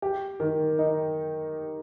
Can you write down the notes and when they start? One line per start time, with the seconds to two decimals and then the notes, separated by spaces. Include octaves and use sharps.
0.02 G4
0.40 D#3
0.79 D#4